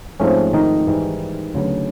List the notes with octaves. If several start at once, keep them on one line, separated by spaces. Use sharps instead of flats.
G#2 F3 A3 C4 C#4
D#3 D#4
G#2 E3 G3
D2 C#3 F#3 B3